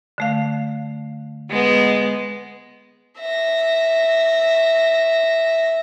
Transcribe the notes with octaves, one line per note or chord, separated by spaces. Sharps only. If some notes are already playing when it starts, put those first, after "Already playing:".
D3 A3 F5
G#3 B3
E5 A#6